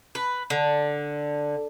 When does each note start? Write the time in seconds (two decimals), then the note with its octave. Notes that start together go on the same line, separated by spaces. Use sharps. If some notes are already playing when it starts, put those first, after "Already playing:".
0.15 B4
0.50 D3